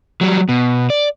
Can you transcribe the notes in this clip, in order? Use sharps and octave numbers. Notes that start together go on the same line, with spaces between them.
F#3 G3
B2
D5